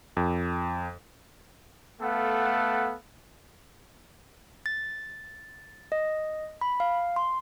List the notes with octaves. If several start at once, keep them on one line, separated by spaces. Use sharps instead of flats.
F2
A3 B3 A4 F5 F#5
A6
D#5
B5
F5
C6